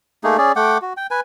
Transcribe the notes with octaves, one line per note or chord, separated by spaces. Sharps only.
A3 A#3 D#4 G#4
C#4 G#4 D5
A3 F#5 G5 D6
F#4
G5
B4 G#5